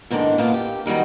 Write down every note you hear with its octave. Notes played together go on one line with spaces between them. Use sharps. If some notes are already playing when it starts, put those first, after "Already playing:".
E2 G#2 D3 D#3 D4
A#2 A#3 B3 F4
G4
D#3 F#3 G3 D#4